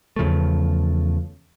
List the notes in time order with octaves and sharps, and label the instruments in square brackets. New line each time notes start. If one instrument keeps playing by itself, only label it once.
[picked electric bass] E2 C#3 F3 A3